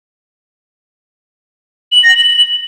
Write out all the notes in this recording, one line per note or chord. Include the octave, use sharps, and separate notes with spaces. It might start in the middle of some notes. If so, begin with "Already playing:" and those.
F#7
A#6
F#7